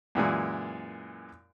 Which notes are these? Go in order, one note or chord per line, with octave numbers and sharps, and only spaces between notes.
F#2 A#2 E3 G#3